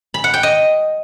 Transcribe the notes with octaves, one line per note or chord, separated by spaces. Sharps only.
B5
F#5
G5
D#5